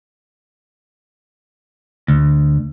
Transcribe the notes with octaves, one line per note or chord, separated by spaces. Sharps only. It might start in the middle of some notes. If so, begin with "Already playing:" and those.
D2